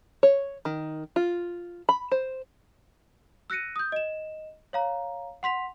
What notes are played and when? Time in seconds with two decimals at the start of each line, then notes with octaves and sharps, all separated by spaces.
0.23 C#5
0.65 D#3
1.16 F4
1.89 B5
2.12 C5
3.50 E6 F#6 A#6 C#7 D#7
3.76 D#6 G6
3.92 D#5 E7
4.73 C#5 F5 A#5
5.43 F#5 C6 B6 F7